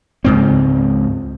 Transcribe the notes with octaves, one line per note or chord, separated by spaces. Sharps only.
C#2 G#2 C4